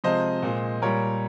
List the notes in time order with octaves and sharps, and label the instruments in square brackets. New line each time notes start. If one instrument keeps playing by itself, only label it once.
[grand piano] C3 F3 G#3 C5 D#5
A#2 G#3
A#2 G3 A#4 C#5